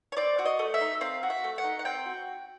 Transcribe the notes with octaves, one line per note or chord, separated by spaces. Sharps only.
C#5
C4 D5
F#4
D#5
A3
E5
D#4
C4 F5
F#4
E5
A3
F#5
D#4
F#5
C4 G5
F#4